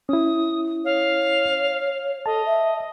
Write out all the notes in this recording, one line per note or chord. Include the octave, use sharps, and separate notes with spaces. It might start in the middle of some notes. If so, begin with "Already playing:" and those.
C#4 E4 D#6
C#5 F5
A4 D#5 A5
E5